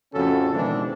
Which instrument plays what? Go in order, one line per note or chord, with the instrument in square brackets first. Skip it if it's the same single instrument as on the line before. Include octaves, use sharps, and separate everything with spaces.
[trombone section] F2 A2 C#3 C#4 F#4 A4
B2 D#3 E3 G#3 C4 D4